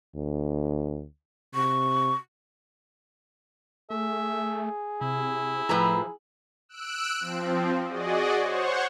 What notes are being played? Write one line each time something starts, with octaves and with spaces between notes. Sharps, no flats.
D2
C3 C#6
A3 G#4 E5
C3 E4
A2 F3 B4 A#5
E6 F#6 D7
F3 C4
F#4 G#4 D5 D#5
C5 C#5 F#5 C#6